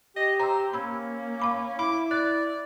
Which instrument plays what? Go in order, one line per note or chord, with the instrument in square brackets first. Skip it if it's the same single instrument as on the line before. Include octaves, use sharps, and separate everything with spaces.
[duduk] G4 [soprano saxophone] D#5
[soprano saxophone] C5 [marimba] A#5 E6
[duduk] A#3 [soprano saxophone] C#4 [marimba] B5 E6 G#6
[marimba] F5 B5 D6
[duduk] E4 [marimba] B5 [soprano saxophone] D6
[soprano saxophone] D5 [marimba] F#6